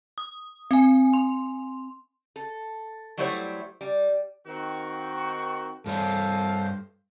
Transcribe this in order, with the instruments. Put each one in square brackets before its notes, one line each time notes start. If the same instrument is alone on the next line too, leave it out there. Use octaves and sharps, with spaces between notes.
[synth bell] D#6
C4 G#5
C6
[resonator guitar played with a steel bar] A4
F#3 G3 A3 E4 C5 C#5
G3
[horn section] D#3 C4 F#4
[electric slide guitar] G2 G3 C#5 [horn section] A4 C5 F5